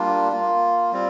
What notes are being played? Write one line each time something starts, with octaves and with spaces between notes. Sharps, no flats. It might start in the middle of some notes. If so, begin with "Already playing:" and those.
Already playing: G3 A#3 D4 F4
A#3 F4
G3 C4 F4